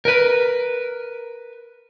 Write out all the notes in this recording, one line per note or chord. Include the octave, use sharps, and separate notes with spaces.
A#4 B4